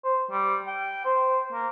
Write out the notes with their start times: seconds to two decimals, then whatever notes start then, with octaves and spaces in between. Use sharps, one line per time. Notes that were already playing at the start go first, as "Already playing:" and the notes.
0.04 C5
0.31 G3
0.67 G5
1.05 C5
1.52 A#3